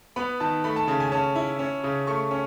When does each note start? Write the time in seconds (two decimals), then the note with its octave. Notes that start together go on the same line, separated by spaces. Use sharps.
0.16 B3 B5
0.40 D#3 A5
0.64 A3 B5
0.76 A5
0.87 C#3 A5
1.00 G#5
1.12 C#4 A5
1.35 E4
1.59 C#4
1.83 C#3
2.07 A3 C#6
2.31 C#4